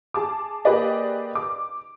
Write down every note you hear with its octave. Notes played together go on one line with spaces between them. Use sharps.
G#4 A5 D6
A#3 G4 G#4 B4 D5 D#5
D6